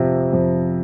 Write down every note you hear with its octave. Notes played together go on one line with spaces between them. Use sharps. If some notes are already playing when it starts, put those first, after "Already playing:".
Already playing: F2 C3 F3
F2